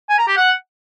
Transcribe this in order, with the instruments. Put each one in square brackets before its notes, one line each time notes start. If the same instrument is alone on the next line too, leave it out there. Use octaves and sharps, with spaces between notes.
[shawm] G#5
A#5
G4
F#5